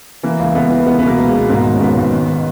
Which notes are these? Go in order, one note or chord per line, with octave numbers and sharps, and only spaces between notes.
E3 A#3
C#2
C#2 B3
E3
C#2 B3
B3
B2
A#3
C#2
G#3
B2
G#2 A#3
D#3
C#4
G#1 B3
G#1
D#3